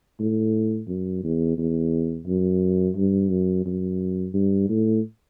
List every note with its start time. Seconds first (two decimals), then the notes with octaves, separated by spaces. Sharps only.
0.19 A2
0.88 F#2
1.24 E2
1.58 E2
2.27 F#2
2.96 G2
3.30 F#2
3.66 F#2
4.34 G2
4.69 A2